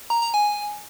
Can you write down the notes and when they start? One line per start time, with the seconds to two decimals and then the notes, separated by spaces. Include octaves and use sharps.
0.10 A#5
0.22 A#5
0.34 G#5